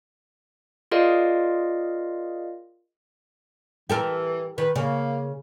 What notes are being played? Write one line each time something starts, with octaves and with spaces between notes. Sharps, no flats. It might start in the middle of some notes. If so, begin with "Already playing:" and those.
F4 G#4 A#4 D5 D#5 F5
E3 G4 A4 A#4
D#3 B4
C#3 A#3